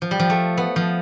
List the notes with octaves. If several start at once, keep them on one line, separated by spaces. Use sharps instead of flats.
F3
G3
F3
A3
B3
F3